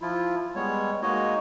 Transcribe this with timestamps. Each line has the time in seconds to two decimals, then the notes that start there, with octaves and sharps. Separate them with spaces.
0.02 F3 E4 F4
0.56 G3 G#3 B3 C#5
1.02 G#3 A#3 D#4 F#4 C#5 D#5